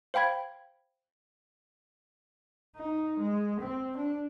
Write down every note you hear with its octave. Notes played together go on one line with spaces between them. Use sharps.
C5 F5 G5 B5 G#6
D#4
G#3
C4
D4